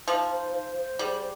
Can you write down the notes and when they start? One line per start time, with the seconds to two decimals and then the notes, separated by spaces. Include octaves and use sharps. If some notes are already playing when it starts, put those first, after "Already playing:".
0.06 F3 D#4
0.30 C5
0.53 C5
0.76 C5
0.99 G3 G#4